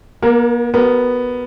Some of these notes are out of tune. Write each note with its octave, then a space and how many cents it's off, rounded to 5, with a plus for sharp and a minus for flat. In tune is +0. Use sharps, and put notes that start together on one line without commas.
A#3 +45 A#4 +0
B3 +0 G4 -45 A#4 +0